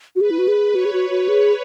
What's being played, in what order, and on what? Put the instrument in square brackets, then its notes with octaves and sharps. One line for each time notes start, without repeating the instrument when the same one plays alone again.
[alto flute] F#4
[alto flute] G#4 [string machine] B4
[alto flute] E4
F#4
G#4
[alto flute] F#4 [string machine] C#5
[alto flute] G#4
F#4
F#4
G#4